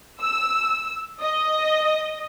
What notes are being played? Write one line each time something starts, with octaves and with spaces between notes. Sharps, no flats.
E6
D#5